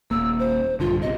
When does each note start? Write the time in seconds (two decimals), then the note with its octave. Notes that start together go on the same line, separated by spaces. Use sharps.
0.11 D#1 G#1 A#3 E6
0.39 C5
0.80 A#1 G2 D3 F4
1.02 A#1 C3 D#5